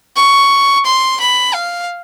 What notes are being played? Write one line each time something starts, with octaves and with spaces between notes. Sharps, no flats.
C#6
C6
B5
F5